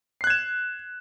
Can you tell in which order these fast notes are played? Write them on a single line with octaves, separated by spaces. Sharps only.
C7 F#6 G#6 E7